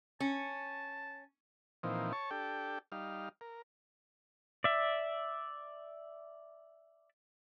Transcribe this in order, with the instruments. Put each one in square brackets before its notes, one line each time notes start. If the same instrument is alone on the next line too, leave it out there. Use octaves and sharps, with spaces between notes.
[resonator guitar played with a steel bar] C#4 [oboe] A5
[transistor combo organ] A#2 E3 F3 C4 D#4
C#5 A5 C#6
D4 G4 A4 G5
G3 D#4 F5
A#4
[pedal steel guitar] D5 E5